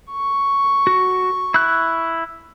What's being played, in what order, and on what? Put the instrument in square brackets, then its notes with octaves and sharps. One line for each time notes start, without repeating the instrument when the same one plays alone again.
[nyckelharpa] C#6
[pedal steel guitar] F#4
E4 F#6